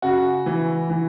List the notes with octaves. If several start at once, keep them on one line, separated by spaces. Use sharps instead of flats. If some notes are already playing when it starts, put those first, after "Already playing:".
C#3 F#4
E3
E3